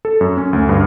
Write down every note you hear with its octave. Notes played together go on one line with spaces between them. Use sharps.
A4
F#2
C#4
D2
G2